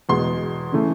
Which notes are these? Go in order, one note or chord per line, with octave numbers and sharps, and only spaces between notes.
E2 B2 G#3 C6
C#3 E3 A3